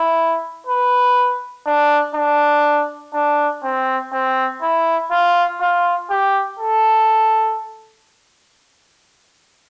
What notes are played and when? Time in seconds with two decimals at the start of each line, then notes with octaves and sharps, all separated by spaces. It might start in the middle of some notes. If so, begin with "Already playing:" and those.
Already playing: E4
0.67 B4
1.66 D4
2.15 D4
3.14 D4
3.64 C4
4.13 C4
4.62 E4
5.11 F4
5.61 F4
6.10 G4
6.59 A4